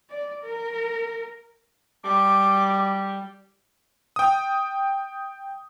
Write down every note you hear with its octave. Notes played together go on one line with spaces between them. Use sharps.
D5
A#4
G3 D6
G5 D#6